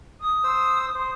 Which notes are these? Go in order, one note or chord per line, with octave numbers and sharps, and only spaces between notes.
D#6
C5 E6
C5